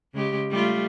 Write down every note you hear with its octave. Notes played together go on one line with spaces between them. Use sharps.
C#3 G#3 G4
G3 A3 F4